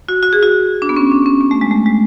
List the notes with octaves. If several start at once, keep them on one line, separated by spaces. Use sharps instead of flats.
F#4
F#4
G#4
F#4
D4
B3
C#4
D4
C#4
B3
A3
G#3
A3
G#3